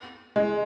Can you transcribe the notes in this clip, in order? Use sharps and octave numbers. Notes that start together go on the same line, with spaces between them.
G#3